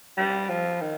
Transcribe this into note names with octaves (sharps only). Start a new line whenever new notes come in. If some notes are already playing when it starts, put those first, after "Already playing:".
G3
F3
D#3